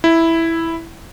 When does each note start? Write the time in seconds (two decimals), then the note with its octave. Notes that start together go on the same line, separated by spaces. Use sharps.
0.04 E4